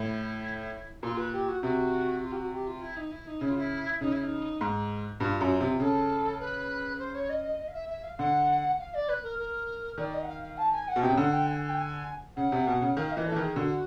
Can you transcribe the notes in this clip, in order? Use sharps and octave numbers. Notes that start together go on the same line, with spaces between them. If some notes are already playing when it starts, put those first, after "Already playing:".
Already playing: A2 E4
A#2 F4
B4
G4
F#4
C3 F#4
F4
G4
F#4
G4
F4
E4
D#4
E4
D#4
C#3 E4
F4
E4
C#3 D#4
E4
D#4
G#2
G2 F4
F#2
C3
C#3 A4
B4
C5
C#5
D#5
D#5
D#5
F5
E5
E5
F5
D3 F#5
F5
D5
B4
A#4
A#4
D#3 D5
D#5
F#5
F5
F5
A5
G#5
F#5
B2
C3 G5
C#3
D3 F#5
G5
G#5
G#5
G5
G#5
C#3 F#5
C3
B2
C#3
D#3 F5
E3 D#5
A4
E3
D#3 G#4
D3 F#4